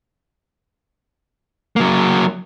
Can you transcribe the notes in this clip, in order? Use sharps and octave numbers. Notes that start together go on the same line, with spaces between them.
F#3 A#3